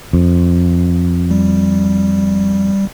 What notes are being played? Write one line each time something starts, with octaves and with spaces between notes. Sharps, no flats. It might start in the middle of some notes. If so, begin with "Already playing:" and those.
F2
G3